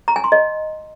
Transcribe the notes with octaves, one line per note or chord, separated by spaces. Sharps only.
A#5
G#5
C6
D#5